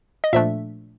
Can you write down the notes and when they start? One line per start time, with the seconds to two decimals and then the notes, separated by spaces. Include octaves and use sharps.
0.24 D#5
0.33 A#2 F3 A3 D4 E5